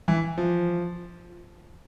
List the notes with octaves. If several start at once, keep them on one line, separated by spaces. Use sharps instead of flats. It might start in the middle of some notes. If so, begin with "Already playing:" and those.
E3
F3